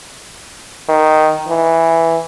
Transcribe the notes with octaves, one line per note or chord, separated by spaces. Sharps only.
D#3
E3